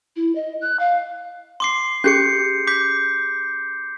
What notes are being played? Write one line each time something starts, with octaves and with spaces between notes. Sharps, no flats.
E4
D#5
F#6
F5
C6 D6 C7
C#4 G4 G#4 G6 C7 C#7
D6 G6 B6